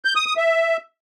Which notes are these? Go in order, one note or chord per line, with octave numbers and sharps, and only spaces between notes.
G6
D#6
D#6
E5